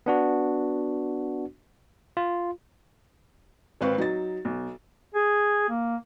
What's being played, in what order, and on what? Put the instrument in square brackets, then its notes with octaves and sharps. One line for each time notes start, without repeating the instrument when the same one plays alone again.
[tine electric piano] B3 D4 F#4
F4
[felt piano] G#1 C4 B4 F5 C#6
F#3 D#4 A6
B1
[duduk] G#4
A#3